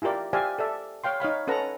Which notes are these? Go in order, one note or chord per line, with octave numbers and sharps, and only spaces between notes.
E4 F4 G4 A#4 D5
G4 C5 D5 E5 F5 G#5
A4 D5 E5
C#5 F5 G5 C6
D#4 C#5 F5 B5
C#4 A4 B4 F#5 A#5